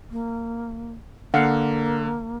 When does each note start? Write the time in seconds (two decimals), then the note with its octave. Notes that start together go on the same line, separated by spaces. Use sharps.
0.11 A#3
1.34 D3 A#3 F5 F#5